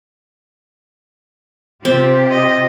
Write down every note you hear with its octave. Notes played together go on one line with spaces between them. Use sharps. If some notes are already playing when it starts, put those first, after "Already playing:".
C3 C4 F4 G4
D#5